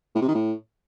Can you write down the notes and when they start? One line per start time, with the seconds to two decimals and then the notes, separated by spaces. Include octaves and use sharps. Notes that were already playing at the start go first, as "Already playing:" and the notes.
0.15 A2
0.22 C3
0.28 D#3
0.35 A2